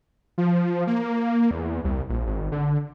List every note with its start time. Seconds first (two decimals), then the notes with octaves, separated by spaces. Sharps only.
0.38 F3
0.87 A#3
1.51 E2
1.84 C2
2.09 A#1
2.26 G#1
2.52 D3